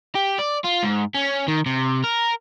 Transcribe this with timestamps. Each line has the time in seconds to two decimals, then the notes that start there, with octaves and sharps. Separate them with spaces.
0.15 G4
0.39 D5
0.64 F4
0.83 G#2
1.14 C#4
1.48 D#3
1.66 C3
2.04 A#4